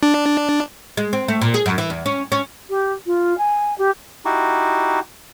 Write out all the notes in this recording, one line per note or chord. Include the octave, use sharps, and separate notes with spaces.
D4
G#3
C4
A3
A#2
G#4
F#2
E3
E2
C#4
C#4
G4
F4
G#5
G4
D#4 E4 F#4 G4